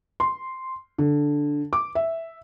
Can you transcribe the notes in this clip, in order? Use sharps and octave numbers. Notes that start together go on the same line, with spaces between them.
C6
D3
D6
E5